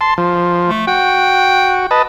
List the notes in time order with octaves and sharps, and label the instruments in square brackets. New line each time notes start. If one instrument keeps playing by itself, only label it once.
[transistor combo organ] A5 C6
F3
[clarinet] A3
[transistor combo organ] F#4 [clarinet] G5
[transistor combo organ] B4 D#5 A5